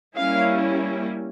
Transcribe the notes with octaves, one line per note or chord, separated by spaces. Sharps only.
G3 A#3 C#4 E4 F5